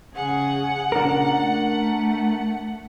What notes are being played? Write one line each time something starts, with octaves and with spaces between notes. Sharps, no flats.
C#3 G#4 F#5
A#2 C#3 D4 A#4
A3